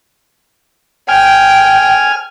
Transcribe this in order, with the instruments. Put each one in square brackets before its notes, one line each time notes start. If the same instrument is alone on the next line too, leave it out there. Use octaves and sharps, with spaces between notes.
[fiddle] G5 [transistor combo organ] G#5 F6